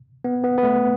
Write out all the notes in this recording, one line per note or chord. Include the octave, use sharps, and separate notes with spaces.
B3
B3
B3
A3